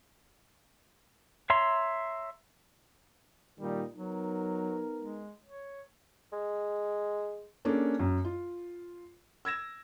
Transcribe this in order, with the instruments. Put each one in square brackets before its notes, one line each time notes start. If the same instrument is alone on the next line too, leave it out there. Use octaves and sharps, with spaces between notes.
[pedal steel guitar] C#5 E5 A#5 C6
[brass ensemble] A#2 D#3 G3 [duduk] D#4
[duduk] F#3 [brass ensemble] B3 D#4 A#4
[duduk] G#3
C#5
[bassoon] G#3
[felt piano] A#3 C#4 D4 G#4 A4
F#2
F4
E6 G#6 A#6 E7